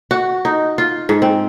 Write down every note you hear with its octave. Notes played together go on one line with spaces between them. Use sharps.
F#4
D#4
F4
G#2
C4